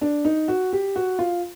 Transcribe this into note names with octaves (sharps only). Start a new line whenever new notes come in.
D4
D#4
F#4
G4
F#4
F4